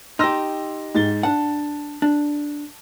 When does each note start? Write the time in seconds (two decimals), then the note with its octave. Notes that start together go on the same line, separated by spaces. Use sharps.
0.19 D#4 G4 C6 E6 A#6
0.95 G#2 A6 G7
1.23 D4 F#5 A5
2.02 D4